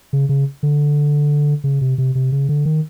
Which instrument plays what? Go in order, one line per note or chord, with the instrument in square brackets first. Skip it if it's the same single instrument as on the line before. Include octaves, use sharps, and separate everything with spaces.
[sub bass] C#3
C#3
D3
C#3
C3
C3
C3
C#3
D3
D#3